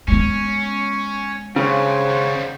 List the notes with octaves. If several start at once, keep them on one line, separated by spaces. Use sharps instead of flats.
G#3 B3 C#4
G2 C#3 C5 C#5 F#5
D#3 G3